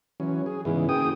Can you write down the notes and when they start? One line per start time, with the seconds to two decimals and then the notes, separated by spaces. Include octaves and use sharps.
0.20 E3 F#3 C#4
0.46 G#4
0.65 E2 G#2 C#3 E3
0.89 F#1 G#4 G5 D#6